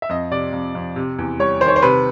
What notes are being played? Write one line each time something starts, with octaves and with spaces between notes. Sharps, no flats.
E5
F2 D#5
C3 D5
F2
F2
C3
E2
G3 C#5
D#3 C5
C#5
C5
C3 B4